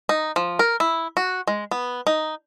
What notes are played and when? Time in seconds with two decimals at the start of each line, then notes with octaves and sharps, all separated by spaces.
0.09 D#4
0.36 F3
0.59 A#4
0.80 E4
1.17 F#4
1.47 G#3
1.71 B3
2.07 D#4